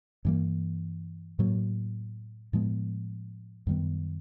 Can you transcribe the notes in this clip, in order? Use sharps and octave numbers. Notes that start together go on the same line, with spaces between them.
G2 E3 G3 A#3
A2 F#3 A#3
A2 F3 G#3 B3
F#2 D#3 G3 B3